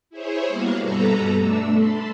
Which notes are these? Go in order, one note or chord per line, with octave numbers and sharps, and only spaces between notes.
E4 G#4 C5 C#5
G3 A#3 B3 F#4 F5
G2 B2 A4 B4 A#5
A3 D4 E6
A5 B5 C6